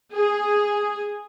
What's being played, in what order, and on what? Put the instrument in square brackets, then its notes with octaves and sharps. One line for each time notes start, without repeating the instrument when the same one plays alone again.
[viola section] G#4